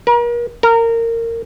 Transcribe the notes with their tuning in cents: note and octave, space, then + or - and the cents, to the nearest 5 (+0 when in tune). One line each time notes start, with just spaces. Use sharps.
A#4 +40
A#4 -20